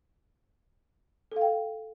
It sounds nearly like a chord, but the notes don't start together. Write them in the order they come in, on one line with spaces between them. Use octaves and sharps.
A4 F5 G5